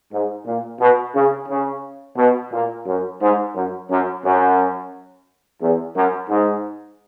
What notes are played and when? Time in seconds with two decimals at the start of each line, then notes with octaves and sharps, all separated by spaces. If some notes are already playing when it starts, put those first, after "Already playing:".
0.11 G#2
0.45 A#2
0.79 B2
1.14 C#3
1.48 C#3
2.17 B2
2.51 A#2
2.86 F#2
3.20 G#2
3.54 F#2
3.89 F#2
4.23 F#2
5.61 E2
5.95 F#2
6.29 G#2